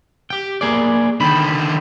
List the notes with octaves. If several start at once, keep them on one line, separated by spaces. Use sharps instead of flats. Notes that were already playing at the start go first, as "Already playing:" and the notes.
G4 G5
A#3 G#4 D5
D3 D#3 B5